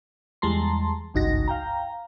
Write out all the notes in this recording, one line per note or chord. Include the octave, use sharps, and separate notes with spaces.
E2 G3 G#3 A5 A#5 C6
G#1 C#2 G2 D#4 F#4 A#6
F5 G5 A#5